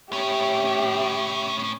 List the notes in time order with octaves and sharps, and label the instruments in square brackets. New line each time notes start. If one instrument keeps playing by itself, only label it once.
[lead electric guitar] A2 C#4 [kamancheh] G4 E5